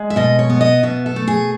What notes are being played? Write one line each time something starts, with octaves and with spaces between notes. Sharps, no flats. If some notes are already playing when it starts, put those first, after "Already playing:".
Already playing: G#3
E5
B2 D#5
C#5
B3
D#5
B2 E5
A4
A3
G#4